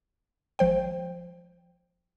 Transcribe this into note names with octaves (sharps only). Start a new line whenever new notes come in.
G#1 F3 C5 G5